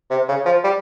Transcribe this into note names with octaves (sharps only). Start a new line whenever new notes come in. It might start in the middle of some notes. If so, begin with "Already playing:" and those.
C3
C#3
F3
G3